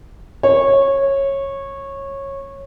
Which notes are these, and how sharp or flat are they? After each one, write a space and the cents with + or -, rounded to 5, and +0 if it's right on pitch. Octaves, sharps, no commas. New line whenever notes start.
C#5 -15